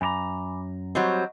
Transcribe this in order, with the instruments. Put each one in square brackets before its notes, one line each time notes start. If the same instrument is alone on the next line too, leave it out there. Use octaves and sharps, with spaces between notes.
[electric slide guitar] F#2 G4 A#5 [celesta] G#5 B5 D6
[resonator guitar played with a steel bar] F#3 G3 C4 [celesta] D#5 F#5